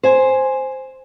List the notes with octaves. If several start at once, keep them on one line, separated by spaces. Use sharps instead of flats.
C5 G#5